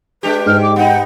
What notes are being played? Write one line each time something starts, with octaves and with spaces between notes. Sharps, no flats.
G#3 D4 G4 B4
G#2 F6
D6
B3 D#4 F#5 G5